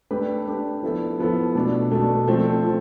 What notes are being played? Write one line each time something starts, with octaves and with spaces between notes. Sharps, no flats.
A3 D4 G4 B4
A3 D4 G4 B4
F3 B3 E4 A4
F3 B3 E4 A4
B2 A3 D4
B2 A3 D4
F3 A3 C4
F3